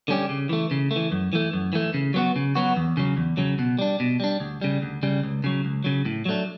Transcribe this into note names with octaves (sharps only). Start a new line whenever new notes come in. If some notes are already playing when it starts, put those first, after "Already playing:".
D3 G3 C#4 G4
C#3
E3 A3
C#3
A3
E3
F#2
E3 A3
F#2
E3 A3
C#3
F#3 B3 F#4
C#3
F#3 B3 F#4
E2
C#3 F#3
E2
C#3 F#3
B2
G3 D4
B2
G3 D4
D2
C#3 G3
D2
C#3 G3
C#2
C#3 F#3
C#2
C#3 F#3
A2
F#3 A3 D4